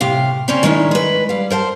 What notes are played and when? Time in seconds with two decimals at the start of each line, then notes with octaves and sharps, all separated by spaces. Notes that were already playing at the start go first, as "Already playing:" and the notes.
0.01 A2 C3 G4 F5
0.48 C#3 C4 C#4 C5 D5 A#5
0.63 D#3 G#3 C#4 D4 E4
0.91 G#3 B4
1.29 G3 F5
1.50 A#4 C5 F5 A5